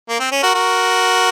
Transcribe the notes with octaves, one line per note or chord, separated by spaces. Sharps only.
A#3
C4
C#4
F#4 A#4
F#4 A#4